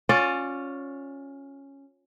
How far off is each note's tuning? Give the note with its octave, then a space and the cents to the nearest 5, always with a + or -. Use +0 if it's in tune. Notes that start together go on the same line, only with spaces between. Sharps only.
C#4 -5 F4 +30 D5 +0